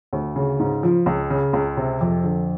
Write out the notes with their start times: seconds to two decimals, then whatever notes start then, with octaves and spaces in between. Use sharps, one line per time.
0.13 D2
0.36 C#3
0.60 G#2
0.83 F3
1.06 C#2
1.30 C#3
1.53 C#2
1.77 C3
2.01 F2
2.24 D3